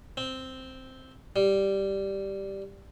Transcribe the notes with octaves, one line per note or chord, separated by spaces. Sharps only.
C4
G3